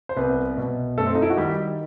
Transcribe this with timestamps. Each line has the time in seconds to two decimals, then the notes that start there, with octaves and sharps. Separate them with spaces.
0.09 C5
0.16 C2 B3 B4
0.57 B2
0.97 F#2 A3 A4
1.07 C4
1.15 D#4
1.22 E4
1.30 F#4
1.37 D#3 G3 G4